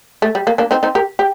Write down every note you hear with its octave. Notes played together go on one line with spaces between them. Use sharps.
A3
G3
A#3
A#3 D4
C4 D#4
C4 D#4
G4 A#4
G4